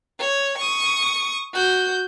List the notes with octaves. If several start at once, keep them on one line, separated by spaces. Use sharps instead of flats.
C#5
C#6 D#6
F#4 G6